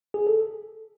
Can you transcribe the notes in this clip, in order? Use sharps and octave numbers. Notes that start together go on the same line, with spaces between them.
G#4
A4